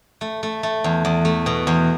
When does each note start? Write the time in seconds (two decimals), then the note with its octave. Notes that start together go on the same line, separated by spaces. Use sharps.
0.21 A3
0.43 A3
0.63 A3
0.84 E2
1.05 E2
1.25 A3
1.46 B2
1.67 E2